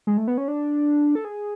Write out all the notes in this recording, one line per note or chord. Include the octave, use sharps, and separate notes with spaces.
G#3
A3
B3
C#4
D4
A4
G#4